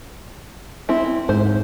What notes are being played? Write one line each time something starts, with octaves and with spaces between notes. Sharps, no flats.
C4 E4
G#2 C5